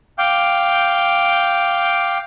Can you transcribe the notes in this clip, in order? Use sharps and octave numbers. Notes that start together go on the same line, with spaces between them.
F5 G5 D6 G6